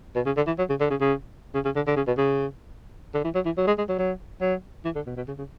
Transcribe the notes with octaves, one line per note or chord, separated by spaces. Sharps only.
B2
C#3
D3
E3
F#3
C#3
D3
C#3
C#3
C#3
C#3
D3
D3
C#3
B2
C#3
D3
E3
F#3
E3
F#3
G#3
G#3
F#3
F#3
F#3
E3
D3
B2
B2
C#3
C#3